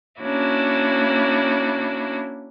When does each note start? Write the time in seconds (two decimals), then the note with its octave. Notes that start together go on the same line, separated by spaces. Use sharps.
0.22 A#3 C#4 D4 E4 F#4